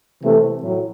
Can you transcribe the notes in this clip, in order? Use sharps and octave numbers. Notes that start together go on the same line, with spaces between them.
C3 E3 A3
A2 F#3